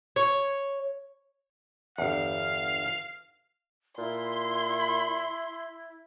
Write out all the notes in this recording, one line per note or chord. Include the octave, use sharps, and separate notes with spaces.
C#5
G1 E2 F5
A#2 E4 C6